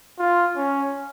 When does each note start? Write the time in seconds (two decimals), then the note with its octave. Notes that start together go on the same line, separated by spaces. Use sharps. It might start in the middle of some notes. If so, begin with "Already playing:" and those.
0.19 F4
0.56 C#4